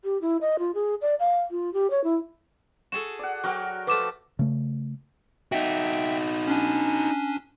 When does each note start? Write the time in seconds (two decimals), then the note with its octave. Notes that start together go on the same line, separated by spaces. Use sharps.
0.04 G4
0.22 E4
0.41 D#5
0.59 F4
0.75 G#4
1.02 D5
1.20 F5
1.51 F4
1.74 G4
1.90 C#5
2.04 E4
2.92 F#4 G#4 A4 E7
3.19 D5 F#5
3.44 F#3 F#4 A#4 G5
3.87 F3 A3 B4 D6 E7
4.39 C#3 A3
5.52 D#4 F#4 E5 G5
6.48 C#4 D4 G#5